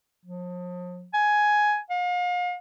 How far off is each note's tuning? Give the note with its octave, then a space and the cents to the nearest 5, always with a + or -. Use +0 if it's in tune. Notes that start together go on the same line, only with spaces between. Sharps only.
F3 +40
G#5 +10
F5 +40